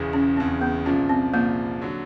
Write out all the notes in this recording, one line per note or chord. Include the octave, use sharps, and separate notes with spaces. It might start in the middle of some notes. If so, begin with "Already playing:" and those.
Already playing: E1 E2 C#3
C#4
E1 E2 C#3 C4
B3
C2 A#2 F3 C#4
C4
C2 A#2 F3 A#3
D3 F#3